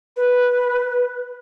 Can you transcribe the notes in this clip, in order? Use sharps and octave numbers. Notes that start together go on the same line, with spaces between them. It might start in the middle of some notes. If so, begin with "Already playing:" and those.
B4